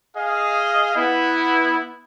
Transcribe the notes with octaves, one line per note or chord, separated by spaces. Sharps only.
G#4 D#5 F5
B3 E4